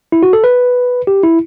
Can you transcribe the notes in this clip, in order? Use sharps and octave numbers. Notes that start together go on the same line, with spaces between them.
E4
F#4
A4
B4
G4
E4